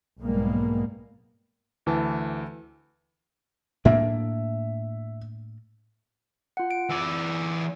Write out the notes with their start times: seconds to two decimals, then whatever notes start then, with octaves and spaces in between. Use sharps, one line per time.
0.20 B1 G#2 G3 G#3 A#3 B3
1.86 D2 E3 A5
3.85 A2 A#3 D4 E5
6.57 F4 F#5
6.71 D7
6.90 E3 D5 E6